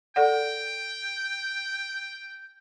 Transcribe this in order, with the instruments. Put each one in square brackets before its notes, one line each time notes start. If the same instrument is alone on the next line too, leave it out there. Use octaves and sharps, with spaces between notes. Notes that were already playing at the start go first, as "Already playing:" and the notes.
[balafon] A4 D5 F#5 [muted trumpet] G5